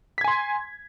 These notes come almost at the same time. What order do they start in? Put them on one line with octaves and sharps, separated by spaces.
B6 G#6 G#5 C6